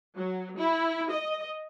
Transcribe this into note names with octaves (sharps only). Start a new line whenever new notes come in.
F#3
E4
D#5